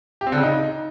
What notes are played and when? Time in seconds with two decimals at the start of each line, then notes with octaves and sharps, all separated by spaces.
0.21 G4
0.27 C4
0.32 D3
0.38 C#3
0.43 D#4